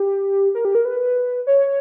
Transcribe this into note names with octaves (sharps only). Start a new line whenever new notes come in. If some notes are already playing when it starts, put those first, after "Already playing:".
Already playing: G4
A#4
G4
A#4
B4
C#5